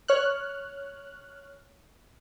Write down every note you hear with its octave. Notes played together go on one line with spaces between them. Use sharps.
C#5 F6 F#6